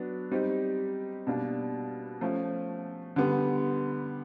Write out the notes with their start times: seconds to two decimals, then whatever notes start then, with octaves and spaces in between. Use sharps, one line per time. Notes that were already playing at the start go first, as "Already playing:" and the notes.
Already playing: F#3 B3 D4
0.31 G3 C4 D#4 G4
1.27 B2 G3 A#3 D4
2.21 F3 A3 C#4
3.16 D3 G3 B3